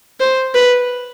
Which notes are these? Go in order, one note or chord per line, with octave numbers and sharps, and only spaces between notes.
C5
B4